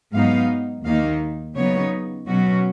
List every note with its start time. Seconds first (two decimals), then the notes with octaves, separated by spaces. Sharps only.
0.13 G#2 F#3 B3 D#4 F5
0.85 D#2 D#3 A#3 D#4 F5
1.56 C#3 F#3 B3 D#4 C#5
2.28 B2 F#3 C#4 F#4